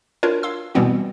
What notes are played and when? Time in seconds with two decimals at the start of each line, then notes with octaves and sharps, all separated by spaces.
0.23 D4 F4 F#4 A#4 B4 C#5
0.43 F5 C6 E6
0.75 B2 E3 G3 B3 C4 F#4